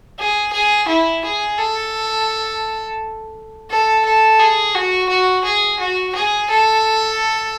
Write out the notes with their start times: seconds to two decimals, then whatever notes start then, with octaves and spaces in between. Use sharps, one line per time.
0.19 G#4
0.53 G#4
0.88 E4
1.24 G#4
1.59 A4
3.70 A4
4.05 A4
4.39 G#4
4.74 F#4
5.09 F#4
5.45 G#4
5.80 F#4
6.16 G#4
6.50 A4